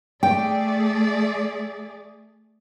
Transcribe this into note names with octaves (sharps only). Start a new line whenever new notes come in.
A3 G#4 D5 G5